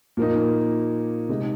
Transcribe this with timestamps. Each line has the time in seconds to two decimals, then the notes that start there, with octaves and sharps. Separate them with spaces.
0.17 A#2 F3 A#3 D#4
1.29 C3 G#3 D#4